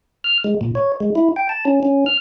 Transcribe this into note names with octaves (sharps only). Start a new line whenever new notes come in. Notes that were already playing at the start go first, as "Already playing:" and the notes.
F6
G#3
A#2
C#5
G#3
E4
G5
A5
C#4
C#4
F6